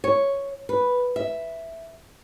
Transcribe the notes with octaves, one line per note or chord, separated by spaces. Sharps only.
C#5
B4
E5